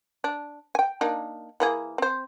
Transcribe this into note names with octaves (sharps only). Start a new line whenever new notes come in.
D4
G5 G#5
A#3 D4 D#4
E3 A#3 G#4
C4 C5